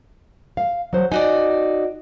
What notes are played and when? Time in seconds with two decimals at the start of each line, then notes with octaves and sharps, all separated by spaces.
0.57 F5
0.93 F#3 C5
1.12 D#4 F#4 D5 G#5